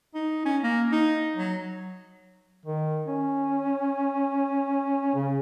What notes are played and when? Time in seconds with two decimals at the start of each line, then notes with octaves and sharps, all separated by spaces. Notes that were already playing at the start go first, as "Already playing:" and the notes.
0.15 D#4
0.45 C#4
0.63 A#3
0.92 D#4
1.36 F#3
2.66 D#3
3.06 C#4
5.14 C#3